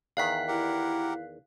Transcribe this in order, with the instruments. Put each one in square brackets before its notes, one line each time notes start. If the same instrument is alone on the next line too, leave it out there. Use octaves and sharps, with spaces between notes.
[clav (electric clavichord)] E2 D#3 [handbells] F5 F#6 B6
[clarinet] E4 [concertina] G4 A#4 F#5